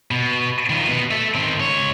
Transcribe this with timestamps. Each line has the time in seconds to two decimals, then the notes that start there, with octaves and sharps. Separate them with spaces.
0.11 B2
0.70 D#3 F3
0.87 B2
1.11 A4 E5
1.35 D#3 C4
1.60 C#2 C#5